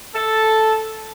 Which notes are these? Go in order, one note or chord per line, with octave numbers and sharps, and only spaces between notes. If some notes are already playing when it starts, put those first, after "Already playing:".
A4